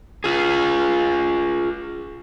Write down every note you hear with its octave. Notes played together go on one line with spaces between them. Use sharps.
F4 G#4